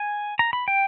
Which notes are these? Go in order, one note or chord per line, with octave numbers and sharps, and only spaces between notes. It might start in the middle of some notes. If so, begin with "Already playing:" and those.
Already playing: G#5
A#5
B5
G5